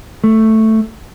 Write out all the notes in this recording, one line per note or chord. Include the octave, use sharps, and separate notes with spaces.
A3